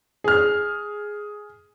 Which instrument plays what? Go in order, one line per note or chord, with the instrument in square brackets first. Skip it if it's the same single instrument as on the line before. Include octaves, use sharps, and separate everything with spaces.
[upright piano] G#4 F6